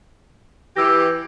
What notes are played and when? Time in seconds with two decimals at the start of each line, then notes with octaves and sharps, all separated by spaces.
0.77 E3 G4 E6 A#6